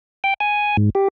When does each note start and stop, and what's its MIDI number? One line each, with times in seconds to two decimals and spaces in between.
0.24 0.34 79
0.40 0.77 80
0.77 0.90 44
0.95 1.08 67